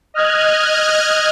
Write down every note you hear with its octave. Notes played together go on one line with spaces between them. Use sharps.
D#5 F6 F#6 G#6